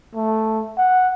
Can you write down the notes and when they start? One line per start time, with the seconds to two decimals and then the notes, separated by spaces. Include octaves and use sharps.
0.15 A3
0.78 F#5